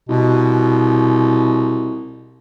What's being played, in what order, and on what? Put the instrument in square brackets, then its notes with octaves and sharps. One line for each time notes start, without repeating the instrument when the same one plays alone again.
[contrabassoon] C2 [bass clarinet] B2